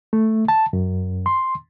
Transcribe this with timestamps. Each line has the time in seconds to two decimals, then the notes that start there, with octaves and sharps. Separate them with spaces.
0.13 A3
0.48 A5
0.73 F#2
1.26 C6